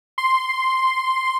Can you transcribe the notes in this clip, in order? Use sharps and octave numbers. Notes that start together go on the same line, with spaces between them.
C6